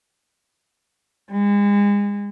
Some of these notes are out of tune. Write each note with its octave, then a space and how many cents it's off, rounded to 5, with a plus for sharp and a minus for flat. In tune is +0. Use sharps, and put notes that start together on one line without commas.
G#3 -35